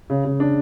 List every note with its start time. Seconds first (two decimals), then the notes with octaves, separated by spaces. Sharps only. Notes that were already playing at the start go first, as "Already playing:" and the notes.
0.10 C#3
0.25 C#3
0.40 D4